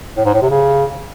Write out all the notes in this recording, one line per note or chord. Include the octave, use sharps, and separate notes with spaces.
A2
G#2
A2
C3
C#3